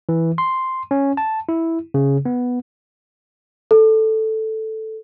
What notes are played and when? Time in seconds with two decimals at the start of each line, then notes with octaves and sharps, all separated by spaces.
0.09 E3
0.38 C6
0.91 C#4
1.17 A5
1.49 E4
1.94 C#3
2.25 B3
3.71 A4